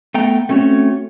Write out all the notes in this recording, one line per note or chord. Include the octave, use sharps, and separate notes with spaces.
A3 B3 G5 A#5
A3 C4 C#4 F#4 C#5